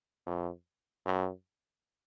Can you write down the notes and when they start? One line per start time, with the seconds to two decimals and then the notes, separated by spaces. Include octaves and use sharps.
0.26 F2
1.05 F#2